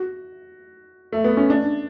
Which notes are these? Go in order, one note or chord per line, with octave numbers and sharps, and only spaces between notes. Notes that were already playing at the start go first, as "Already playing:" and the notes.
Already playing: F#4
A3
B3
C#4
D4